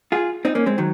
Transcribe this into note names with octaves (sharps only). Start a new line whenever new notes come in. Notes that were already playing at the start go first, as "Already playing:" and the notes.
F4 G#4
C4 D#4
A#3 C#4
G#3 C4
D#3 F#3